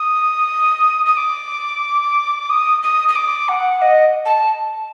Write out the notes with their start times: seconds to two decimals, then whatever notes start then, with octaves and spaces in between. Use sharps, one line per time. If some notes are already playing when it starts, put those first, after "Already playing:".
Already playing: D#6
1.06 D#6
1.17 D6
2.49 D#6
2.83 D#6
3.08 D#6
3.16 D6
3.49 F#5
3.82 D#5
4.25 A5